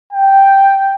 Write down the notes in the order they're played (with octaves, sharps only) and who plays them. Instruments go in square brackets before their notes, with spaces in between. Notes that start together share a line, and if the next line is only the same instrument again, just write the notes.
[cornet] G5